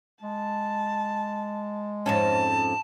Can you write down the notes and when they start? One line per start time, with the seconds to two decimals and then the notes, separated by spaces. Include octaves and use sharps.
0.22 G#3 A5
2.06 F2 G#2 C#4 A5